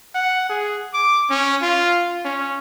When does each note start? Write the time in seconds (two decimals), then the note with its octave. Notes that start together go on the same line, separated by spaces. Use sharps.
0.15 F#5
0.49 G#4
0.94 D6
1.30 C#4
1.62 F4
2.25 C#4